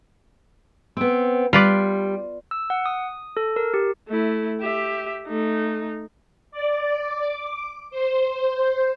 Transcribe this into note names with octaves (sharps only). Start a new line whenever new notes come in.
B3 C4
G3 F4 B4 D5
E6
F#5
D#6
A4
A#4
G4
A3 E4
G4 E5
A3 D#4
D5
D6
C5